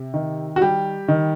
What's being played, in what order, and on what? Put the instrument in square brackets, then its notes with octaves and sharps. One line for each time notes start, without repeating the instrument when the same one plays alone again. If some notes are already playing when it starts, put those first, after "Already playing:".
Already playing: [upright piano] C3
D#3
F#4
G3 G4
D#3